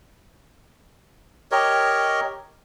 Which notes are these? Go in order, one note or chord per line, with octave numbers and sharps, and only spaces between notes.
G4 A#4 C#5 D#5